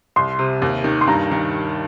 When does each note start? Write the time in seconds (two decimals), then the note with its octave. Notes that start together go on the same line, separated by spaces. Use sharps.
0.16 C2 C6
0.39 C3
0.62 D#2
0.84 D#3
1.01 C6
1.07 G2 A#5
1.31 D#3